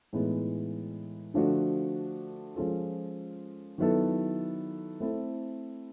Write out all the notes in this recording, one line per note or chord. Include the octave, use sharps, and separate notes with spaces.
A2 E3 G#3 B3 D#4
D3 F3 A3 D4 F#4
F3 G#3 C#4 F4 A4
D#3 F#3 B3 E4 A4
A3 C4 E4 A4